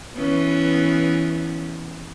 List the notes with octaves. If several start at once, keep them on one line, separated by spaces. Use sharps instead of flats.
E3 B3 C#4